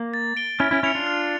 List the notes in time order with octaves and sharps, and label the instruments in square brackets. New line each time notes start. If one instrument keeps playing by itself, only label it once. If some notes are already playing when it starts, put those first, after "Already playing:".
Already playing: [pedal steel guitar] A#3
[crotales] A6
D7 G7
[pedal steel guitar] C#4 E4 [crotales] F6
[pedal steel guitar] C#4 E4
[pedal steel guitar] C#4 E4 [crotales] C#7 F7
[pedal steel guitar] D4 F4
[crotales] F6